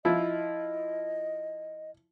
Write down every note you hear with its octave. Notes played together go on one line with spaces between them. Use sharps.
F3 E4 D#5